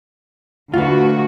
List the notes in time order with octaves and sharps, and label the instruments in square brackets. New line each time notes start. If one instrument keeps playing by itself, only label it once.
[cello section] D2 F#4 [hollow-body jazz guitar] F4 B4